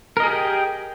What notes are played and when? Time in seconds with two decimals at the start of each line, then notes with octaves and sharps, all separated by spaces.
0.17 A#4
0.20 D#5
0.23 G#4
0.27 G4
0.30 G5